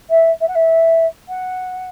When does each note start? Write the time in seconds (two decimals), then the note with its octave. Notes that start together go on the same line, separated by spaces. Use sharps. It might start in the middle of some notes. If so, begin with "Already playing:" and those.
0.10 E5
0.40 E5
0.47 F#5
0.55 E5
1.28 F#5